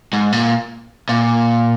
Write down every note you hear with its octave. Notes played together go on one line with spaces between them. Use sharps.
G#2
A#2
A#2